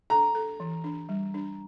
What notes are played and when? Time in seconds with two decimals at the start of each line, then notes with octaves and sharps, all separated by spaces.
0.10 A4 A#5
0.35 A4
0.60 E3
0.84 D4
1.09 G3
1.34 D4